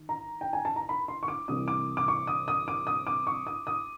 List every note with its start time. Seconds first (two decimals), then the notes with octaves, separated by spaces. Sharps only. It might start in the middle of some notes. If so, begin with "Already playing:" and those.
Already playing: D#3
0.09 A#5
0.41 G5
0.53 G#5
0.65 A5
0.76 A#5
0.89 B5
1.08 C6
1.23 C#6
1.28 D6
1.48 C2 C3 E3 D#6
1.68 D6
1.97 D6
2.08 C#6
2.27 D#6
2.48 D#6
2.68 D6
2.87 D#6
3.07 D6
3.27 C#6
3.47 D#6
3.67 D#6